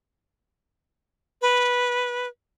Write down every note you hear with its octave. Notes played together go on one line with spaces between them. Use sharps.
B4